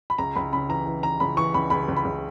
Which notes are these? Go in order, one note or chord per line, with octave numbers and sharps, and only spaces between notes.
B5
C#2 A#5
C#2 B5
C#3 B5
E3 A#5
E3
E3 A#5
C#2 B5
E3 C#6
C#2 B5
C#2 B5
C#2
B5
C#2